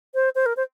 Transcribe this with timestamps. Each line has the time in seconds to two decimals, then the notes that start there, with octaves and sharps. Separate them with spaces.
0.15 C5
0.35 C5
0.46 A#4
0.57 C5